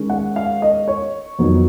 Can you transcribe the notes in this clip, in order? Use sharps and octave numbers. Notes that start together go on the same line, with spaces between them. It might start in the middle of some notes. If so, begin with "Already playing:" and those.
Already playing: D#3 G#3 C#4
F#5
F5
D#5
C#5
F2 D#3 F#3 B3 D#4